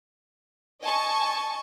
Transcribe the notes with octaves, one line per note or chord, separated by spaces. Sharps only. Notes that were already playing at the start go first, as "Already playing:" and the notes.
D#5 G#5 A5 C#6